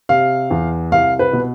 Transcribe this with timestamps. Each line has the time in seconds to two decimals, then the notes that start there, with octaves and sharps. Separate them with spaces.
0.09 C3 F5
0.51 E2
0.91 C2 F5
1.19 B4
1.33 B2